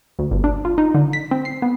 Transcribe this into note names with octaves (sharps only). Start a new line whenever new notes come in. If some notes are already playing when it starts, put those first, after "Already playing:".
D2
G1
D4
F4
D#4
D3
B6
C4
C7
B3